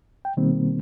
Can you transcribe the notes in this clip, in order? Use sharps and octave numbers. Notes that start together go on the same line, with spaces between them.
G5
B2 D#3 G3 A#3 C4